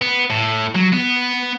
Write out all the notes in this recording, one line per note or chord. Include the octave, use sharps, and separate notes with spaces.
B3
A2
F#3
B3